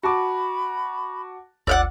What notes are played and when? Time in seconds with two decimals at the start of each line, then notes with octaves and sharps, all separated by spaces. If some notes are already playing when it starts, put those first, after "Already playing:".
0.03 F#4 A5 B5 D6
1.67 G1 D2 D5 F5 F#5 E6